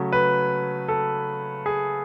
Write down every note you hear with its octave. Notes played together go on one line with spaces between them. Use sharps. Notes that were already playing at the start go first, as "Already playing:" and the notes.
Already playing: C#3 F#3 A3
B4
A4
G#4